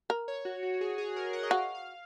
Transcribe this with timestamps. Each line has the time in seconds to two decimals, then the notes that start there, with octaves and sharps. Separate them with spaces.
0.10 A#4
0.28 C#5
0.45 F#4
0.63 F#4
0.74 F#4
0.81 G#4
0.98 G#4
1.16 A#4
1.33 F#5
1.43 D#5
1.50 F#4 F5
1.75 F5